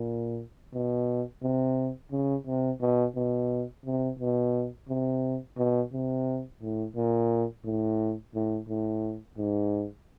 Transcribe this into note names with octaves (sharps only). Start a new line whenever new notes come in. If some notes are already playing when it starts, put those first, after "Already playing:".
Already playing: A#2
B2
C3
C#3
C3
B2
B2
C3
B2
C3
B2
C3
A2
A#2
A2
A2
A2
G#2